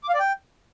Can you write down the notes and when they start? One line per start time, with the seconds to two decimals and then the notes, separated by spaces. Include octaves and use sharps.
0.03 D6
0.09 F5
0.14 D5
0.19 G5